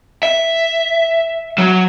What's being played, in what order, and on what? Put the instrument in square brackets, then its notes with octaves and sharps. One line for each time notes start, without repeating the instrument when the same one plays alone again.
[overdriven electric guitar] E5
F#3